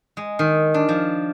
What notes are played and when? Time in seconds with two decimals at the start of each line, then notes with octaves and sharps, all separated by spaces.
0.17 G#3
0.39 D#3
0.74 D4
0.89 F3